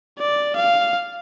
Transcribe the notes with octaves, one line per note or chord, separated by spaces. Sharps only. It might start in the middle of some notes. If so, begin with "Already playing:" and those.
D5
F5